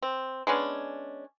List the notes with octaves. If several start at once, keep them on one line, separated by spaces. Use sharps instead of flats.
C4
G#3 B3 C#4 D4